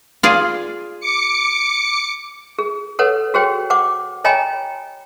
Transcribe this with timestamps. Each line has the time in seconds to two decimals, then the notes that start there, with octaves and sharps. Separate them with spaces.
0.23 F4 G#4 D5
1.00 D6 C#7
2.59 G#4
2.99 A4 B4 C#5 F#5
3.34 F#4 G#4 C5 C#5 G5
3.70 C5 F#5 D6
4.24 C#5 D#5 G5 G#5 A#5 B5